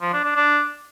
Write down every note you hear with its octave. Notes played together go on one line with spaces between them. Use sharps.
F3
D4
D4
D4